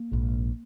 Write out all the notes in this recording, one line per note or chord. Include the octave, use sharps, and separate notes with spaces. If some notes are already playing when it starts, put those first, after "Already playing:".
Already playing: A#3
A#1 G#2